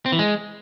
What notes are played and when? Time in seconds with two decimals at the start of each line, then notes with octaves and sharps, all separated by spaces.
0.06 C4
0.12 E3
0.19 G#3